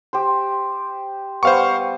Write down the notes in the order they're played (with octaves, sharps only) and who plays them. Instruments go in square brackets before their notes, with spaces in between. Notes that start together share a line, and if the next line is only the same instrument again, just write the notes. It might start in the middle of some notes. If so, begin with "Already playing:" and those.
[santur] G4 C5
[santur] G3 B3 [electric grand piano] C5 F5 C#6